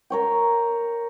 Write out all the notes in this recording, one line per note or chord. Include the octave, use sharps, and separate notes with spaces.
A#4 C#5 G5